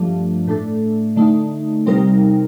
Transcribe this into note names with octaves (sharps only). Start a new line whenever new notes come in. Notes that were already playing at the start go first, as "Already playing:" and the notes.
Already playing: G2 F3 A3 D4
A2 A3 D4 A4
D3 A3 D#4
C3 G3 C4 D#4 A#4